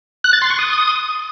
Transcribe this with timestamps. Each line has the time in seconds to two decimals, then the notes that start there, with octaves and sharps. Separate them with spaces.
0.24 F#6
0.33 A6
0.42 C6
0.50 C#6
0.59 D#6